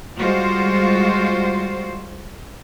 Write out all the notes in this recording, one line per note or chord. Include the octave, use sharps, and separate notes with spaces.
G3 G#3 F4 F#4 C5